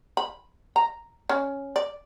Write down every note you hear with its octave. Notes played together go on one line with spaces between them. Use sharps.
B5
A#5
C#4
D5